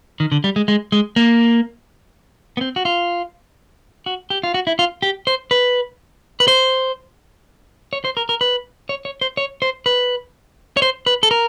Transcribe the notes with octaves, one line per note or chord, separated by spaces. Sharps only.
D#3
D3
G3
G#3
G#3
G#3
A#3
B3
C4
F#4
F4
F#4
G4
F4
F#4
E4
F4
G4
C5
B4
B4
C5
C#5
C5
A#4
A#4
B4
C#5
C#5
C5
C#5
C5
B4
C#5
C5
B4
A4
A#4